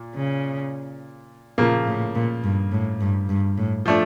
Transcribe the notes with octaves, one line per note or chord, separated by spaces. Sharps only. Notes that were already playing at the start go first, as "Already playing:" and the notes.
Already playing: A#2
C#3
A#2 C#3 F3 A#3
A2
A#2
G2
A2
G2
G2
A2
F3 A3 D4